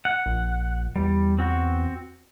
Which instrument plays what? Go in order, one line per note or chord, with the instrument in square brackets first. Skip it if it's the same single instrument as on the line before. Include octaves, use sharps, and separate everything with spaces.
[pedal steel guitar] F#5
[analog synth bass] A#1
[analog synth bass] E2 [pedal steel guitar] G3
[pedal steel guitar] C4 F#4